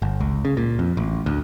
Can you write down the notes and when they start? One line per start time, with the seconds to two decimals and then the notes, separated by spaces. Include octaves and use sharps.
0.02 G1
0.20 C#2
0.45 C#3
0.57 A#2
0.79 F2
0.97 A1
1.26 D2